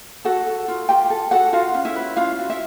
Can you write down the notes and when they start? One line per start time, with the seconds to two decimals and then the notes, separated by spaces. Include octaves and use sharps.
0.25 F#4 A4 F#5
0.46 A4
0.68 F4
0.89 F4 G4 G5
1.10 A4
1.31 F#4 A4 F#5
1.53 F4 F#4 F5
1.74 C#4
1.85 E4 E5
1.96 B4
2.17 C#4 F4 F5
2.39 F#4
2.49 E4 E5